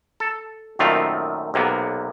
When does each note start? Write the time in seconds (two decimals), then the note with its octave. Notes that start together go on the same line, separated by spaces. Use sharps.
0.20 A4
0.79 F#2 A#2 D#3 A3 C4 F4
1.54 B1 C3 A#3 B3